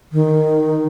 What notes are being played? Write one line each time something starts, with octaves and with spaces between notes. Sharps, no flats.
D#3